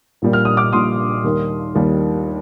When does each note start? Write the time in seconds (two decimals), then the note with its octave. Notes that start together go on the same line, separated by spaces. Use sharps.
0.22 A#1 A#2 G3 A#3
0.33 F6
0.45 D#6
0.57 D6 F6
0.73 A#1 A#2 G3 A#3 C6 D#6
1.24 D#2 D#3 G3 A#3
1.75 D#2 D#3 G3 A#3